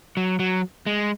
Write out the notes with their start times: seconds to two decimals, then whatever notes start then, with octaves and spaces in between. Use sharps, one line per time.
0.17 F#3
0.39 F#3
0.86 G#3